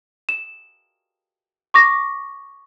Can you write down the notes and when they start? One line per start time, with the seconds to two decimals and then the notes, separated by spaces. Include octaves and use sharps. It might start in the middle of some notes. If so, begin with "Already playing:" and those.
0.29 E7
1.74 C#6 D6 A#6